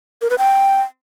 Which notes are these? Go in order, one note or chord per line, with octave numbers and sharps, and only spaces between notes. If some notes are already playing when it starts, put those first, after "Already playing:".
A#4
B4
G5